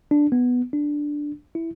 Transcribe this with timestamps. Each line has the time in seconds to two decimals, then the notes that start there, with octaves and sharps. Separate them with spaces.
0.11 D4
0.32 B3
0.73 D4
1.55 E4